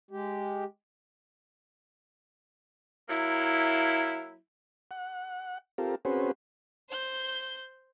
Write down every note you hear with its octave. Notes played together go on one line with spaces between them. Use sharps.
G#3 G4
F#3 A#3 E4
F#5
C4 F4 G4 A4 A#4
C4 C#4 F#4 G#4 B4 C5
C5 G6